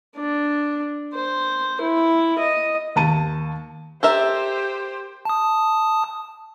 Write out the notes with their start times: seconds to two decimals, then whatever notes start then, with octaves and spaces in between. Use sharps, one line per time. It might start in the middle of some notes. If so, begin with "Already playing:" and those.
0.17 D4
1.14 C5
1.81 E4
2.39 D#5
2.96 D#2 A5 D#7
4.03 G4 A4 A#4 C5 E5
5.25 A5 D#6